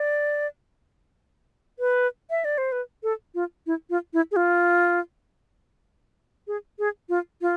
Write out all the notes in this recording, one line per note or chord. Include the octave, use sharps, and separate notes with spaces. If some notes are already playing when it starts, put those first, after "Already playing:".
Already playing: D5
B4
E5
D5
C5
B4
A4
F4
E4
F4
E4
G#4
F4
G#4
G#4
F4
F4